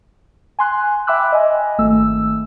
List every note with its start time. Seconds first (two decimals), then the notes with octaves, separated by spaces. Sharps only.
0.59 G#5 C6 F#6
1.07 E5 G5 B5 D6 E6 F#6
1.32 D#5 G#5
1.78 G#1 A3 E6